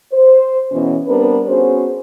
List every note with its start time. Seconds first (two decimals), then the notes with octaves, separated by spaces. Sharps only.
0.12 C5
0.72 E2 B2 E3 B3 C#4
1.08 G3 B3 C4 D4 A#4 B4
1.47 B3 C#4 F#4 G#4 C5